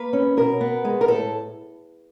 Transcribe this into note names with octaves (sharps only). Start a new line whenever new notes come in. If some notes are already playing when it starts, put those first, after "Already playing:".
Already playing: A#3 B4
C#4
B2 A#4
B3
G#3
A#4
A2 A4